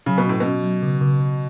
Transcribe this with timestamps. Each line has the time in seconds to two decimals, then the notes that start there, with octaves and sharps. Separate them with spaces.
0.06 C#3 F#3
0.18 B2
0.26 A2 C#4
0.40 B2 C#4
0.63 F#3
0.83 C#3
1.01 C#3
1.20 C#3